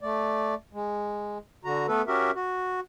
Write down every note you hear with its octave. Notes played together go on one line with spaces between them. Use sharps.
A3 D5
G#3
D3 F#4 A#5
A3 B3 A4 B4
C#4 F#4 G4 A#4 E5
F#4